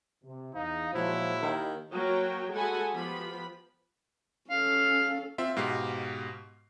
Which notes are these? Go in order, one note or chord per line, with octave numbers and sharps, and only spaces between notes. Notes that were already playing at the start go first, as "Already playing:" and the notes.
C3
E2 D#4 F5
A#2 F3 F#3 G#3 E4
D#2 D#3
F#3 A#3 F#4 A#4 C#5 G5
G#3 F#4 A4 F#5 G#5 B5
F3 B3 G4 B5
C#4 A4 F5
C4 F4 E5
G#2 B2 G4 F5 C7